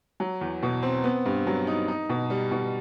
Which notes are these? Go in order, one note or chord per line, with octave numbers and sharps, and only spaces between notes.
F#3
E2
B2
C4
B3
G2
F#3
D#4
D#4
B2
G3
B2